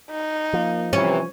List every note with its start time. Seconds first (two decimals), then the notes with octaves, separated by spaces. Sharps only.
0.11 D#4
0.53 F3 A#3
0.93 C3 E3 C#4